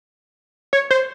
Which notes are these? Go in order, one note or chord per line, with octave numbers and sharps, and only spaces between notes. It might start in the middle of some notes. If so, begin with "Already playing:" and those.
C#5
C5